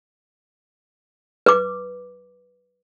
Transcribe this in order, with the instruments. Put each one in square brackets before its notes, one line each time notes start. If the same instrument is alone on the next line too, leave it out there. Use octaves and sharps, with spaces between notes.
[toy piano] B4 D6